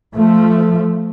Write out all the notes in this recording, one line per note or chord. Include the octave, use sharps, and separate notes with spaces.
F3 A3